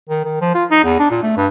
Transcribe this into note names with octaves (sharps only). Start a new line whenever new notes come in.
D#3
D#3
F3
F4
D#4
E2
D4
A#2
A3
G2